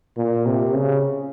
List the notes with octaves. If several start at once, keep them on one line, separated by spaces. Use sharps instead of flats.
A#2
C3
C#3